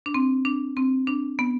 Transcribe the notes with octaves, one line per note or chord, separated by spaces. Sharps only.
D4
C4
D4
C4
D4
B3